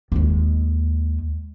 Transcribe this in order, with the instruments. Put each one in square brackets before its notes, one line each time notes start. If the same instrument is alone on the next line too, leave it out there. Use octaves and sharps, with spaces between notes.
[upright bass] D#2 G#3